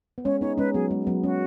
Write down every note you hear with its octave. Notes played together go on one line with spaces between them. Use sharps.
B3
G#3 C#4 C#5
B3 D#4 C#5
G#3 C#4 B4
F#3 B3 G#4
G#3
F#3 B3
G#3 C#4 F#4